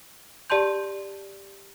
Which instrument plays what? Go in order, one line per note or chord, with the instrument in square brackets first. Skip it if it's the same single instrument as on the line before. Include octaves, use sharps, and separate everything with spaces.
[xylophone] G4 D5 A5 C6 G6